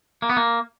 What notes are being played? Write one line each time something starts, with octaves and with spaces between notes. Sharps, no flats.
A#3
B3
A#3